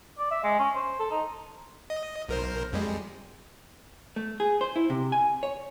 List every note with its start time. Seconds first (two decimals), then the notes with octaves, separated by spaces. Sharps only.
0.19 D5
0.31 E5
0.44 G#3
0.59 C#4
0.75 C5
0.99 A4
1.11 D#4
1.90 D#5
2.29 B1 A#4 C5
2.73 F2 G3 G#3
4.16 A3
4.40 G#4
4.61 C5
4.76 E4
4.90 C3
5.12 G#5
5.43 C#5